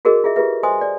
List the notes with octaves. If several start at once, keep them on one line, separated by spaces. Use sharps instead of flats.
F#4 G#4 A#4 D#5 D6
F4 G#4 D#5 E5
F4 G4 G#4 B4 E5
C5 D#5 E5 G#5 C6 D#6
D5